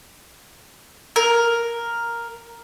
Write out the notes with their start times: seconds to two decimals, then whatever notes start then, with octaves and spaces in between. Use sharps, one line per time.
1.16 A#4